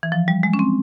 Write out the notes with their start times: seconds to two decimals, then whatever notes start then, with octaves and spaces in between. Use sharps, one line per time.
0.03 E3
0.12 F3
0.28 G3
0.43 G#3
0.54 C#4
0.59 C4